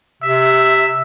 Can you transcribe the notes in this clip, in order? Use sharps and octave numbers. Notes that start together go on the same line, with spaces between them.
C3 E5